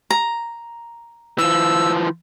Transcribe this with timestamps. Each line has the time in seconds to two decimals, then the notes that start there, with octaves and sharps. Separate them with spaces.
0.10 A#5
1.38 E3 F3 E6